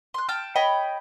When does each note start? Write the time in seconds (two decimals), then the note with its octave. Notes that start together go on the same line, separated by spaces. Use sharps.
0.14 C6 F#6
0.29 G5 A5 F6 G6
0.56 C#5 D#5 G5 B5